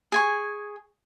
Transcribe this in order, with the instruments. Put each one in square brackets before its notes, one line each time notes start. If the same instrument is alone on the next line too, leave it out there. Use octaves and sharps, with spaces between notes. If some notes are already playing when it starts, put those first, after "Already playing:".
[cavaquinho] G#4 G#5 C#6